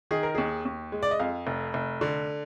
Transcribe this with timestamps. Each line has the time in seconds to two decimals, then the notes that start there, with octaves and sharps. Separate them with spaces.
0.11 D#3 G#4
0.23 A#4
0.35 D#2 G#4
0.65 D#2
0.92 G#3
1.03 D5
1.11 D#5
1.19 F2 F5
1.47 F1
1.74 F1
2.01 D3